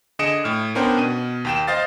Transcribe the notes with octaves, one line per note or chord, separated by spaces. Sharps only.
D3 G#4 D#5 C#7 D7 E7
A2 F6
B3 C#4 D4 A#4 C5 G5
B2 D#7
D#2 G5 E7
C5 D#5 F5 A6